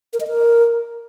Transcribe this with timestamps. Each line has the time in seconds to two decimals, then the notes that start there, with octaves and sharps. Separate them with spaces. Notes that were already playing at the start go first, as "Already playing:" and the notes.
0.13 A#4
0.20 D#5
0.27 A#4